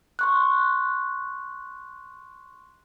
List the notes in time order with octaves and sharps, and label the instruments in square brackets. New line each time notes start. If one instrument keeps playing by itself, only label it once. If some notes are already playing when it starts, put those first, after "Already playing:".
[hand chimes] C6 C#6 F#6